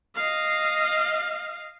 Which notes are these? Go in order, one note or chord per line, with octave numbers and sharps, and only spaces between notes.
D#5 F5